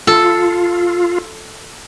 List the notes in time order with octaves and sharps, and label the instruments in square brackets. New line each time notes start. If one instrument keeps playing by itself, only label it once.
[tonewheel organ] F4 [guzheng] A4